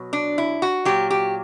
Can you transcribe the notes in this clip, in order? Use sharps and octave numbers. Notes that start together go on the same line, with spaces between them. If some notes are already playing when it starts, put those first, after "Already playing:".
Already playing: B2 F#3
D4
E4
F#4
A#2 F#3 G4
G4